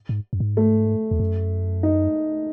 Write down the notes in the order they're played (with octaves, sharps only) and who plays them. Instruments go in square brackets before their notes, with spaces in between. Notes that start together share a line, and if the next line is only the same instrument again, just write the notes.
[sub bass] G#2
F#2
G#2
[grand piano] A3
[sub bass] E2
F#2
[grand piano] D#4